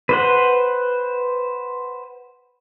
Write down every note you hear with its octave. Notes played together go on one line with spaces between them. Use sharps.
B4 C5 F#5